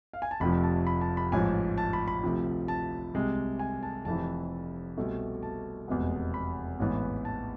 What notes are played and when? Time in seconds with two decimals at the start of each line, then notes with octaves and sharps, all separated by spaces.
0.13 F5
0.22 G#5
0.31 A5
0.40 F1 F2 C3 F3 B5
0.63 A5
0.87 B5
1.01 A5
1.17 B5
1.32 A1 G#2 F3 G#5
1.78 A5
1.93 B5
2.08 B5
2.23 D2 C3 F3
2.68 A5
3.14 C2 C3 G#3
3.59 G#5
3.83 A5
4.05 F1 F2 E3 A5
4.97 C2 B2 A3
5.43 A5
5.88 F1 E2 B2 G#3 B3
6.34 B5
6.80 A1 G#2 E3 B3
7.25 A5